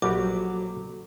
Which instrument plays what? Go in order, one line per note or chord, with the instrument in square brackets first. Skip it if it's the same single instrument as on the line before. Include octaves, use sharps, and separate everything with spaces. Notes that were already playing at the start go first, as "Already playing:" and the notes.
[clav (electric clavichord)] A#1 G3 G4 [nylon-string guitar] F#3 [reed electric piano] A#3 F#4 A4 [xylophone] D6